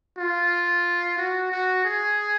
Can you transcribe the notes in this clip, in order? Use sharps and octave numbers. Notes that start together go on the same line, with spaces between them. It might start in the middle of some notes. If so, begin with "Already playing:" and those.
F4
F#4
F#4
G#4